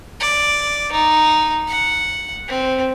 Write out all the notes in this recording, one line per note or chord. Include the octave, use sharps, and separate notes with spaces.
D5
D#4
F#5
C4